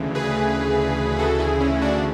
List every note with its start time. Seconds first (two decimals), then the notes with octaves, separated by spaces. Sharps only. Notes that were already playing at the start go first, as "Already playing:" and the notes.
Already playing: D2 C#3 E3
0.15 G#4 B4
1.19 F#4 A4
1.39 E4 G#4
1.61 C#4 E4
1.82 D4 F#4